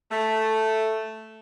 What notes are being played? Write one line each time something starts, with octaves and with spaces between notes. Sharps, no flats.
A3